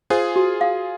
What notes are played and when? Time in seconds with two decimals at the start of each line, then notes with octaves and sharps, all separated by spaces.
0.10 F4 G#4 C5
0.36 F#4
0.61 F5